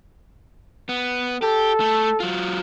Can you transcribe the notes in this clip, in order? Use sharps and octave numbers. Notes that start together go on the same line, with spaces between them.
B3
G4 A4
A3
F#3 F4